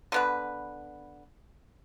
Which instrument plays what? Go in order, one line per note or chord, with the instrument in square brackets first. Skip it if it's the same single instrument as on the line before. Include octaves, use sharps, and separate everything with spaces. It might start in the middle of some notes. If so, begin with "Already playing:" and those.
[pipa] D3 B3 B4